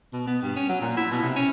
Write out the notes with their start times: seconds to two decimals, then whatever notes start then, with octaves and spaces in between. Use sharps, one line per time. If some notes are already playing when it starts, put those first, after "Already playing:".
0.13 B2
0.27 B3
0.42 G2
0.56 C#4
0.69 F#3
0.81 A#2
0.97 E4
1.11 B2
1.23 C3
1.36 C#4